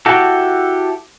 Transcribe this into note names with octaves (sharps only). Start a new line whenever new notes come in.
E4 F#4 G4 A4